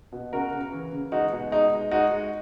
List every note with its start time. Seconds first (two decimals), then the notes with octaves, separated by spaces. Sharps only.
0.12 B2
0.33 C#3 F#4 A#4
0.52 C#3
0.72 E3
0.92 C#3
1.12 G#3 D#4 F#4
1.32 B2
1.52 G#3 D#4
1.72 G#3
1.91 G#3 D#4 F#4
2.12 G#3